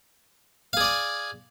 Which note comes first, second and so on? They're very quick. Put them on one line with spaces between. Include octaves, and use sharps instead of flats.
F5 G#4 D5 G#5